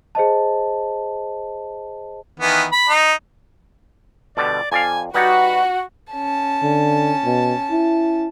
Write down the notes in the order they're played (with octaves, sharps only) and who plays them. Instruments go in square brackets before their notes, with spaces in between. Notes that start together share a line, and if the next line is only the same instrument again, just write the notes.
[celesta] G#4 C5 D#5 A5
[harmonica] D#3 E3 B3
B5
D#4
[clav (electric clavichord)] B2 D3 G3 [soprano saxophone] D5
[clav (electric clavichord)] F2 D5 F5 [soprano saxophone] G#5
[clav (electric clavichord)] G3 D#4 C#5 [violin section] F#4 [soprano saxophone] B4 [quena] F#5
[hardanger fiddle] C#4 A5
[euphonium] D3
B2
E4